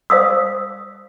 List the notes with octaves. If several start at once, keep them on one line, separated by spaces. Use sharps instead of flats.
C5 F5 D#6 E6